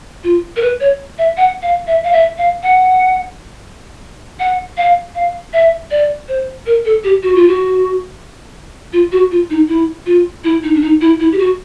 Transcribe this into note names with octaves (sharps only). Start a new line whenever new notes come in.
F4
A#4
B4
C#5
E5
F#5
F5
E5
F5
E5
F5
F#5
F#5
F5
F5
E5
D5
C5
A#4
A4
G4
F#4
F4
F#4
F4
F#4
F4
D#4
E4
F4
E4
D#4
D4
D#4
E4
E4
G4
F#4